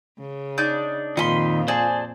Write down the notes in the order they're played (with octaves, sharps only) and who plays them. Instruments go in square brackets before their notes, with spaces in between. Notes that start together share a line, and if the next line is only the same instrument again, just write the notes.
[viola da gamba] C#3
[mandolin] D4 D#4 G6
[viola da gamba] F2 A#2 [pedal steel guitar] D#3 C6 [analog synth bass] F4 [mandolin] D#5 B5
[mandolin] G#4 [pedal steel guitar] C5 D5 A5